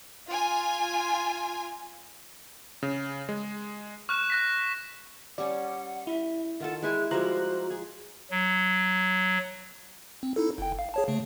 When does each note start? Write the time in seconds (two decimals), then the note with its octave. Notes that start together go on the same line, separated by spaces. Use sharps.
0.29 F4 G#5
2.83 C#3
3.29 G#3
4.09 C#6 F6 F#6 E7
4.30 F#6 A#6 B6
5.38 G3 C#4 D5 F#5
6.07 E4 E5
6.60 D#3 F4 A4 F#5
6.82 G#3 E4 G#4 G#5 F#6
7.11 F3 G3 G#3 F#4 C5 A#5 C6 F#6
7.70 G#4
8.31 F#3
10.23 C4
10.36 D#4 E4 A4
10.58 G1 G5
10.79 F5
10.94 G#4 C#5 A5
11.08 C#3 A3